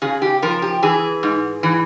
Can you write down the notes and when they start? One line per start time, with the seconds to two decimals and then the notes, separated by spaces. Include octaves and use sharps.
0.02 C#3 G#4
0.22 G4
0.42 F3 A#4
0.62 G4
0.83 E3 G#4
1.23 G#2
1.63 E3